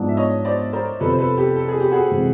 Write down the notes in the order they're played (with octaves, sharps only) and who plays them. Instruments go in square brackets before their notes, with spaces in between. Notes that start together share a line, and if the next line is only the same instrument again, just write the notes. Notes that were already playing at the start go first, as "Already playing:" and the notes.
Already playing: [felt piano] G#2 F3 G#3 B3 D4
[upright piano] E5
C#5 D#5
C5 D5
A#4 C5
[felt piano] F2 C3 F3 [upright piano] A4 B4
[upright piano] C5
A4 B4
G4 A4
A4
G#4
G4
F#4 G#4
[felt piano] C3 E3 G#3 C4